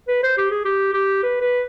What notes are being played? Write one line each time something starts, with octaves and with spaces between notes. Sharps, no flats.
B4
C5
G4
G#4
G4
G4
B4
B4